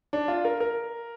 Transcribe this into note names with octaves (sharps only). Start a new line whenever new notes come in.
D4
F4
A#4
A#4